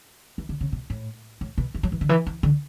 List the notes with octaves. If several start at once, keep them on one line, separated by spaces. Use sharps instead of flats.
E3
D3
C#3
B2
A2
A2
B2
E3
F#3
E3
D3
E3
E3
D3